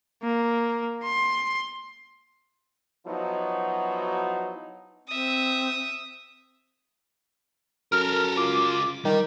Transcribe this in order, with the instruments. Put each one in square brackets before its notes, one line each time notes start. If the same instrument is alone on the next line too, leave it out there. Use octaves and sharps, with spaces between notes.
[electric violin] A#3
C6
[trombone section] F3 F#3 B3 D#4 E4 F#4
[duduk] C4 [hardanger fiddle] E5 D#6
[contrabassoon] F#2 [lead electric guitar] A4 A#4 [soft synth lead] F6
[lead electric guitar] C#2 F4 [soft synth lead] D6
[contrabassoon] D#3 [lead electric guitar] G3